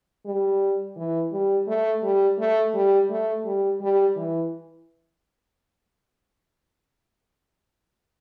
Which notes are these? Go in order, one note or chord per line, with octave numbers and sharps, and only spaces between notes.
G3
E3
G3
A3
G3
A3
G3
A3
G3
G3
E3